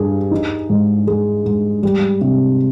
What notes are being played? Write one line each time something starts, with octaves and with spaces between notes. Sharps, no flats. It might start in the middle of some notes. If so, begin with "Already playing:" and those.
Already playing: G2 G#4
D#4
G#2
G#3
G#2
G3
C3